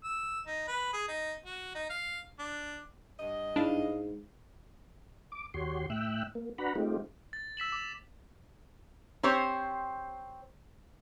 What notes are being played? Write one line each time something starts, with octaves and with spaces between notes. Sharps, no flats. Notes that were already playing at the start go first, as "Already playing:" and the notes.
E6
D#4
B4
G#4
D#4
F#4
D#4
F5
D4
G2 D#5
G#2 D4 E4 F5
D6
D#2 F#4 G4 C#5 C6
A2 E5 G5 E6 F#6
A#3
D4 F#4 B4 F#5 A#5 B5
G#3 A3 C4 D#4 F4 G4
A6
E6 B6 E7 F#7
D6
C4 G4 C5 C#5